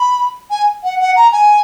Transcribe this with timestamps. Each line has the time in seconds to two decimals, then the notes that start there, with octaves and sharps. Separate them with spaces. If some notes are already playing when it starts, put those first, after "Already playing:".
Already playing: B5
0.50 G#5
0.83 F#5
0.99 F#5
1.16 A#5
1.32 G#5